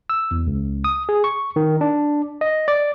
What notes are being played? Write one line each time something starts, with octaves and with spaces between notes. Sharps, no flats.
E6
E2
C#2
D#6
G#4
C#6
D#3
D4
D#5
D5